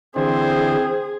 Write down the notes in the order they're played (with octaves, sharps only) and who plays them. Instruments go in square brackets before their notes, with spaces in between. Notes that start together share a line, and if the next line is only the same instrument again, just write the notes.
[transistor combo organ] D3 E3 [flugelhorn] C4 [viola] G#4 [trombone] C5